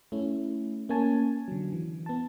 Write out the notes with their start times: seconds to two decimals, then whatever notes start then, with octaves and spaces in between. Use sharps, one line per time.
0.12 A3 C#4 E4
0.89 A#3 C#4 C#5 G#5 A5
1.48 D3 F#3
1.73 E3
2.06 B3 A5